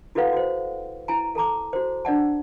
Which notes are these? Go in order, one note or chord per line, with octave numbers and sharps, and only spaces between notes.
E4 F#4 A4 B4 F5 F#5
F#4 C5
E4 G#5 A#5
A4 A5 A#5 D6
F#4 C5
D4 D5 F#5 A5